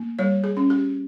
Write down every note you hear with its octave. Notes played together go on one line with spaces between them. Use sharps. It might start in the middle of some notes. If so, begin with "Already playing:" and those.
Already playing: A#3
G3 C#5
G#4
C#4
G4